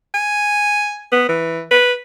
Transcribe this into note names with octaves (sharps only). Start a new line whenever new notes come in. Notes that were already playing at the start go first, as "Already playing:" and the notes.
G#5
B3
E3
B4